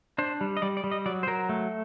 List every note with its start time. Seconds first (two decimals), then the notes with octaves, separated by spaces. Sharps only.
0.18 D4 C5
0.41 G3
0.57 D#5
0.62 G3 D5
0.77 D5
0.84 G3
0.92 D#5
1.06 F#3 D5
1.23 C5
1.27 F#3 A#4
1.49 A3